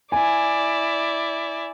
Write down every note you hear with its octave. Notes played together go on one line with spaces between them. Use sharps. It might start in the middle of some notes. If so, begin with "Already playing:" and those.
E4 D5 G#5